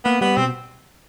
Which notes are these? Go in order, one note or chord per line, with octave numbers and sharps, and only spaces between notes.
A#3 B3
G3 B3
B2 C4